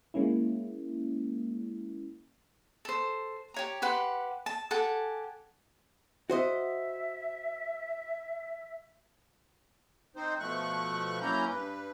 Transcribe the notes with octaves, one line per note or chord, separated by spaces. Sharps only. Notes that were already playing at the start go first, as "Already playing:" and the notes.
G#3 A#3 C#4 E4
A4 C5
G4 C#5 A#5
G4 B4 F#5 C6
A5
G4 A4 F#5 G#5
F#4 C5 D#5 E5
C4 D#4 C5
B2 F3 A3 C#6 F#6
F#3 A#3 C#4 E4 A#5 G6
G2 B4